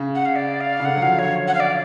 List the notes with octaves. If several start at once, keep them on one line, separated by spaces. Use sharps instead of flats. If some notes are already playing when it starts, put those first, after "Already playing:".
Already playing: C#3
F#5
F5
D5
F5
C#3
D3 F#5
F#3
F3 F5
D3 C#5
F#5
F5
D5